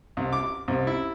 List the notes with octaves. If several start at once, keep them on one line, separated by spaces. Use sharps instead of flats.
C2
D6
C2
E4